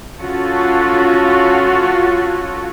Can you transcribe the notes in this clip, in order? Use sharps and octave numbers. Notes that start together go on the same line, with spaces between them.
C#4 F4 F#4 A4